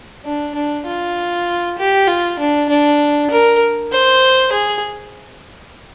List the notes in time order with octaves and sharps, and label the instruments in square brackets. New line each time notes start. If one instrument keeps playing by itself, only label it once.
[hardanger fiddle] D4
D4
F4
G4
F4
D4
D4
A#4
C5
G#4